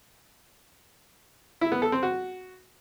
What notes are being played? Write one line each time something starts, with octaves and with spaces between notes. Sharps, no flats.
E4
B3
A4
C4
F#4